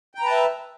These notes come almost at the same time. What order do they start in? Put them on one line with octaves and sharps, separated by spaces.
G5 A#5 B4 A5 E5